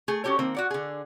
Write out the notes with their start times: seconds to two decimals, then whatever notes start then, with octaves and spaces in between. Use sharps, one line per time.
0.08 A3 G#4
0.24 C#4 F#4 G4 A4 C#5
0.39 D#3 A#3 C4
0.55 F#4 D5 F#5
0.71 D3 G#4